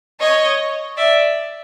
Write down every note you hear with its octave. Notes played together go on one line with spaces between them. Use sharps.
C#5 D#5
D5 E5